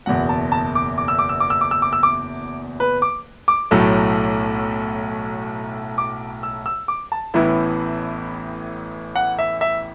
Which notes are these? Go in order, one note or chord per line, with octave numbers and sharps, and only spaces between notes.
F#1 E2 B2 F#5
A5
A5
D6
D6
E6
D6
E6
D6
E6
D6
E6
D6
E6
D6
B4
D6
D6
B1 A2 F#3 A3
D6
E6
E6
D6
A5
A1 A2 E3 B3 E4
F#5
E5
E5